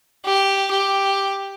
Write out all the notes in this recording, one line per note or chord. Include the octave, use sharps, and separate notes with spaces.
G4
G4